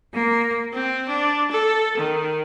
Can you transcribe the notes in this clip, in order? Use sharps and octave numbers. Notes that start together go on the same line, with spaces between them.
A#3
C4
D4
A4
D#3